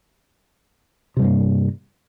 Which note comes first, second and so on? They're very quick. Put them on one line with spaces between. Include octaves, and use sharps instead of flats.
C3 G3 G2 A#3